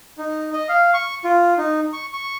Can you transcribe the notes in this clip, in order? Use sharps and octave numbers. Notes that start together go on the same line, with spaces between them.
D#4
D#5
F5
C#6
F4
D#4
C#6
C#6